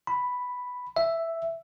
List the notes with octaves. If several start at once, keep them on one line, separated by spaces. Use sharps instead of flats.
B5
E5